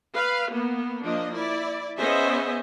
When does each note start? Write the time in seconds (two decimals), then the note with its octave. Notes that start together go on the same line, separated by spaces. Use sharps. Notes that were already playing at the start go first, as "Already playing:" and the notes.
0.14 B4 F5
0.51 A#3 B3
1.03 F3 A#3 D4 D#5
1.35 E4 D5
1.97 B3 C#4 G#4 C5 D#5 E5